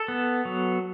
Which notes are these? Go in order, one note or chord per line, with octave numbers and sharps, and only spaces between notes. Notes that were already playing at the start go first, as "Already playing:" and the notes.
Already playing: A4
B3
F#3